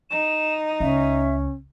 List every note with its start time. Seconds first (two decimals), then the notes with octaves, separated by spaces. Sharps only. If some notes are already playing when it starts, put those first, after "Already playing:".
0.10 D#4 E7
0.80 C#2 C#4 E5